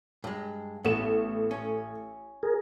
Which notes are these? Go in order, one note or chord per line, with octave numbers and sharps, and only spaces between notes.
G2 G#3
A1 A3 B3 E7
C#4
G#4 A#4